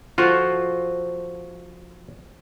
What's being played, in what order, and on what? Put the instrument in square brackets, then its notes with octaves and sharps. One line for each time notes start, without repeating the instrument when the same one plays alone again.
[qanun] F3 A4 C5 [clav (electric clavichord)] F4 F#4